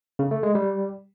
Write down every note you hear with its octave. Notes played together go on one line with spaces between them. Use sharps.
C#3
A3
G#3
G3